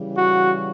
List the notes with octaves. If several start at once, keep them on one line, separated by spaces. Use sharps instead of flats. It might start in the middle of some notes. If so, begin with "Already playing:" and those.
Already playing: C#3 E3 G3
F#4